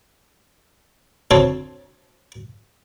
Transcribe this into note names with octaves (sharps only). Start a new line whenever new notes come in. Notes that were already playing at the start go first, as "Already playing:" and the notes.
D2 C4 A4 C#5